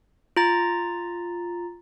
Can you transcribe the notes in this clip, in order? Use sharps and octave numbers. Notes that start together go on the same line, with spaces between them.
F4 A#5 A6